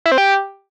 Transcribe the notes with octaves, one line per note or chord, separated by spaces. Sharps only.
E4
C4
G4